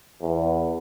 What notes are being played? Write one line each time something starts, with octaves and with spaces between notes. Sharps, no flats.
E2